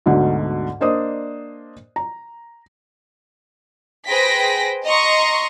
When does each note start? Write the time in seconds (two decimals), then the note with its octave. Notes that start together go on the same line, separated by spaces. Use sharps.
0.06 D2 G#2 B2 D3
0.81 A#3 D4 C5 D5 D#5 D#6
1.96 A#5
4.07 G#4 B4 C5 G5 A#6 B6
4.85 D#5 A#5 C6 C#6